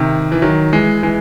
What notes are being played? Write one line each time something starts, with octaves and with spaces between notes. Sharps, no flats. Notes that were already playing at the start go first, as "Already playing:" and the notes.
Already playing: C3 D#3
E3
D#3 F#3
E3 G#3
E3 G#3